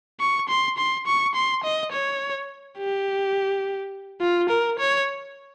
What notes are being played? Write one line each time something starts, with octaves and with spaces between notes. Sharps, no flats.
C#6
C6
C6
C#6
C6
D#5
C#5
G4
F4
A#4
C#5